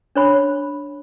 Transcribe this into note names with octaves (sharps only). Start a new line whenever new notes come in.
D4 C#5 B5